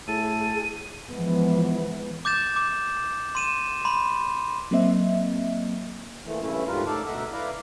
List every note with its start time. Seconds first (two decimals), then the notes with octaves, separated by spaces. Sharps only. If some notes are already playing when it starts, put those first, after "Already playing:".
0.08 A2 G#4 A4 D#7
1.10 E3 F3 G#3 B3
2.25 D6 G6 A6 E7
2.56 D6
3.35 C6 D#7 E7
3.85 B5 C6
4.71 F#3 A#3 C4 D#5 E5
6.26 A#2 E3 A3
6.41 G2 C#3 E3 A3 C#4 E4
6.67 D2 G#2 G3 F4 A#4 B4
6.86 A2 D#4 A4 D5 F5 A5
7.06 D2 B2 A3 A#4 E5 F#5
7.33 E4 B4 D5 F5 A#5